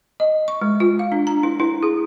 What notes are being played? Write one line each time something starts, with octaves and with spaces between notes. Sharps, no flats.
D#5
C#6
G#3
F4
F5
D4
A#5
E4
E4
G#4